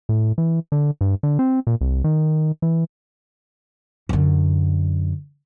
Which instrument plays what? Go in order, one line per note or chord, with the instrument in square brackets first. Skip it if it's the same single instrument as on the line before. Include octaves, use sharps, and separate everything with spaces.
[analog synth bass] A2
E3
D3
G2
D3
C4
A#2
C2
D#3
E3
[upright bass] F#2 D3